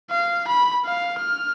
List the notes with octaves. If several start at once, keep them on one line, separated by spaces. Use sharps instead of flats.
F5
B5
F5
F6